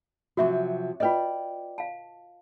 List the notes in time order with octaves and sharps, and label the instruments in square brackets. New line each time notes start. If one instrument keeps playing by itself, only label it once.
[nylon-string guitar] C3 F3 F#3 [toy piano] F#4 E5 C#6
[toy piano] F4 B4 D#5 [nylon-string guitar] D5 G5
[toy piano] F5 A5